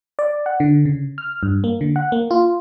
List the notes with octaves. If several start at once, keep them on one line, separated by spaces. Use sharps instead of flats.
D5
F#5
D3
C#3
F6
G2
A#3
D3
F#5
A#3
F4